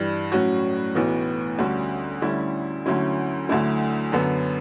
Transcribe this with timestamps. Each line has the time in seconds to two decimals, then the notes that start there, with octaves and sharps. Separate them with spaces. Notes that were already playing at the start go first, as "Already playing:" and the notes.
Already playing: G2 E3 G3
0.32 A2 F#3 C#4 F#4
0.95 B1 A2 E3 B3 F#4
1.58 D2 D3 G3 C#4 F#4
2.22 D2 D3 G3 C#4 E4
2.86 D2 D3 F#3 C#4 E4
3.49 D2 D3 F#3 A3 E4
4.12 F#2 D3 F#3 B3